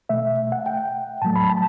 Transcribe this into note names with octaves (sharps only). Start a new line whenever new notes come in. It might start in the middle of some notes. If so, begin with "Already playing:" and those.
B2 A3 E5
F#5
G5
A2 F#3 A3 A5
B5
A5